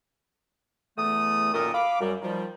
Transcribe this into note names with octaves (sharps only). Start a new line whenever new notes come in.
E2 A3 D#6
F#2 A#2 D#3 A4 A#4 D#6
F5 B5 D6
F#2 G3
D#3 F3 G3